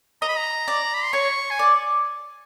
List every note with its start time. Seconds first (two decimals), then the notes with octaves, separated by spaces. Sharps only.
0.22 D#5 A#5
0.29 B5
0.37 A#5
0.68 D5
0.94 B5
1.03 C6
1.13 C#5 C#6
1.50 G#5
1.59 D5